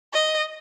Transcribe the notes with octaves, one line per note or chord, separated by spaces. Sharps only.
D#5